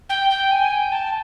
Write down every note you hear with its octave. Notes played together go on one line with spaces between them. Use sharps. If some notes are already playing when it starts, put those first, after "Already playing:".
G5
G5
G#5
G5
A5